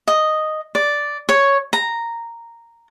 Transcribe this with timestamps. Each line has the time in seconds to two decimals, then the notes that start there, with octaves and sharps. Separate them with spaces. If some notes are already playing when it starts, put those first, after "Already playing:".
0.08 D#5
0.75 D5
1.29 C#5
1.73 A#5